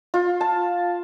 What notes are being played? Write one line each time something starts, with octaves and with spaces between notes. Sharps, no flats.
F4
A5